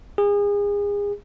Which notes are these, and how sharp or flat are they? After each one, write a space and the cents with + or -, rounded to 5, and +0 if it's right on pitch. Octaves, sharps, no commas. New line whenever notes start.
G#4 -30